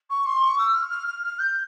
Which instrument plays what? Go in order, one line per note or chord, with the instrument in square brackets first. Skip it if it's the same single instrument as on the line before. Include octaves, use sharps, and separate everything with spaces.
[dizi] C#6
C6
C#6
E6
F6
F6
F6
F6
G6